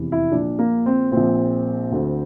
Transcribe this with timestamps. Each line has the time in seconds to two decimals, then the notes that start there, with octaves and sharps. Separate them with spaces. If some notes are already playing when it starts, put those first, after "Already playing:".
Already playing: F1 E2 C3 E3
0.12 E4
0.32 A#1 A#2 D4
0.59 A#3
0.86 C4
1.12 A#1 A#2 C4
1.92 D2 D3